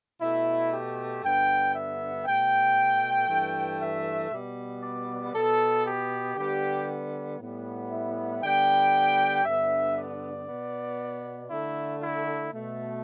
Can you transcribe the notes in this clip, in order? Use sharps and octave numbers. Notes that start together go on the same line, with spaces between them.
B2 A3 E4
G4
G2 D3 B3 G5
E5
B2 A3 G5
G2 E3 A3
E5
B2 G3 B3
D5
B2 B3 A4
G4
D3 G3 B3 G4
A2 G3 B3
E4
D3 G3 B3 G5
G2 D3 B3 E5
D5
B2 B3
D3 A3 E4
E4
B2 A3